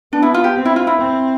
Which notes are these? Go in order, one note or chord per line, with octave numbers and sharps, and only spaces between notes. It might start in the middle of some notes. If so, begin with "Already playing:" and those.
B3 D4
E4
F4
G4
C4
E4
F4
E4
C4